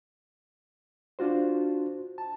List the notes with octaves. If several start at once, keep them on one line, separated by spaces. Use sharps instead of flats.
D4 F4 F#4 C5
A5